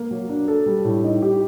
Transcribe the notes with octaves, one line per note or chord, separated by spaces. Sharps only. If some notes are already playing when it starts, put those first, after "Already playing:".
Already playing: A#3
F#3
D4
A4
G3
A2
D#4
G4